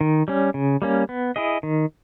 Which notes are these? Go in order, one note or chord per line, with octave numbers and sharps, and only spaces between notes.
D#3
G3 C#4
C#3
G3 A#3 C#4
B3
E4 G#4 D#5
D#3